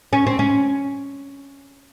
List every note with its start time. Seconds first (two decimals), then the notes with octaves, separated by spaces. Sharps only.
0.13 C#4
0.27 C4
0.39 C#4